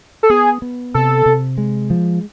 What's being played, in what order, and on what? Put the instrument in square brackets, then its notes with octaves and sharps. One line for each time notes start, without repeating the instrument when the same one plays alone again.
[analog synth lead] A4
[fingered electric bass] B3 [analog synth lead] G#4
[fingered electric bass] B3
[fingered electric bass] C3 [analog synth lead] A4
[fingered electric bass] C3
G#3
F3